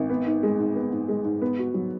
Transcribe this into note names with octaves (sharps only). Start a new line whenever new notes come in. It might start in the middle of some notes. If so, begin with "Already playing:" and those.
Already playing: G#1
B3
G#2
G#3
G#2
B3
G#2
G#3
G#2
B3
F#4
F#3